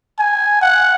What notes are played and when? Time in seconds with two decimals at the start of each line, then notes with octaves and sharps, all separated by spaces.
0.19 G#5
0.61 F#5